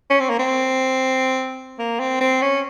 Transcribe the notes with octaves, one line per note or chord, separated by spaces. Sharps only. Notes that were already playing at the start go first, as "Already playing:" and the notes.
C#4
C4
A#3
C4
A#3
C4
C4
C#4